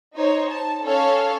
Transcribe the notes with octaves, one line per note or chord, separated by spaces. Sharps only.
D#4 C5 C#5
A5
C#4 A4 C#5 F5